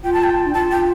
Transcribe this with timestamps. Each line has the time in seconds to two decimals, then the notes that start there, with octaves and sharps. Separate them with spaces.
0.04 F4 G5
0.13 A5
0.24 G5
0.46 D4
0.54 F4 A5
0.71 G5